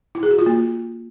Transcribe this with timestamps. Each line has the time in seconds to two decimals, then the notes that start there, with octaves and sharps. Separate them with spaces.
0.15 E4
0.23 G#4
0.31 F#4
0.39 F4
0.46 A#3